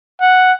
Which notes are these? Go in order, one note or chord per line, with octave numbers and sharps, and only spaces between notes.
F#5